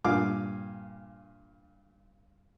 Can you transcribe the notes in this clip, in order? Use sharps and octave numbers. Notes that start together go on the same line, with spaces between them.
G2 A#2 F5 G#5 D6